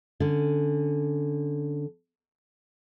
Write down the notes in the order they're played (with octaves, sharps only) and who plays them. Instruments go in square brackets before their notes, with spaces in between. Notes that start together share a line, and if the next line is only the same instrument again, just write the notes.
[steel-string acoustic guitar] D3 C#4